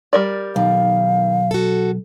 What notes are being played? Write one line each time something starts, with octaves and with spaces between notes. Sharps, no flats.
G3 A#4 D5
B1 D#3 F5
F#4 A4